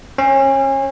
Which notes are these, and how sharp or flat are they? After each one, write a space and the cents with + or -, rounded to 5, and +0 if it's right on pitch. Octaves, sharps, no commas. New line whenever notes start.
C#4 -30